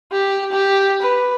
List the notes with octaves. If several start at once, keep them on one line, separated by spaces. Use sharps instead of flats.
G4
G4
B4